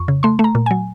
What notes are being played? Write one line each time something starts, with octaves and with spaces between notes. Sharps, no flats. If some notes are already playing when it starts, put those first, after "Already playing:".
Already playing: F2 C#6
C#3
A3 C6
A3
A#5
A#2
F#3 G#5